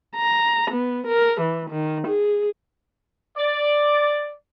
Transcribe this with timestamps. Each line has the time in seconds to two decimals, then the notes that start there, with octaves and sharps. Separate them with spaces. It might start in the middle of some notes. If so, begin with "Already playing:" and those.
0.16 A#5
0.71 B3
1.07 A#4
1.41 E3
1.70 D#3
2.08 G#4
3.37 D5